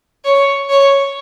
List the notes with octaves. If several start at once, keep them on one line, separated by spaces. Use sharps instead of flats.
C#5
C#5